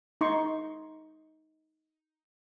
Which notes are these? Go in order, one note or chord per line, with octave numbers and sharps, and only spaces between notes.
D#4 C6 C#6